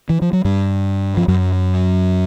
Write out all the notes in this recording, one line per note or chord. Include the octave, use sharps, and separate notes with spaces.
E3
F3
F#3
G2 G3
F3
F#2 F#3